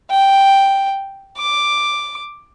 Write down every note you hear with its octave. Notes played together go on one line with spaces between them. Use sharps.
G5
D6